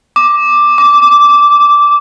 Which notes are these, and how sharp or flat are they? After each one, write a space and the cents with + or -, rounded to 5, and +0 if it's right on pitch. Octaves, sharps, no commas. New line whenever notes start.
D6 +5
D6 -10